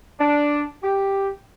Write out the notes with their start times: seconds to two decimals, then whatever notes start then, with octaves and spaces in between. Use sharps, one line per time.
0.20 D4
0.83 G4